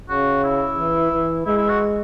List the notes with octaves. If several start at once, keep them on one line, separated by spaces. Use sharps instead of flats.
C#3 F#4
E4
E3
E3
G#3 E4
E4
F#4